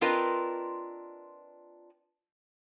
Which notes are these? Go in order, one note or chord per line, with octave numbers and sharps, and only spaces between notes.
C4 D4 F4 A#4 B4 D#5